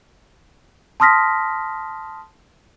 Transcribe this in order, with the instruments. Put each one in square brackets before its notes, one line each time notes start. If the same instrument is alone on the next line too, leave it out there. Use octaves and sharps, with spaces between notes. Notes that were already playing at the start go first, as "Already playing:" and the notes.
[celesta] A5 C6 D#6 F6 A#6 B6